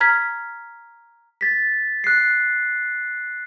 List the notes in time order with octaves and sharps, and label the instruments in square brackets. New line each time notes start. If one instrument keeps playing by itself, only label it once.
[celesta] A#5 F6 G#6 B6
[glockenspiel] A6 B6
F#6 C7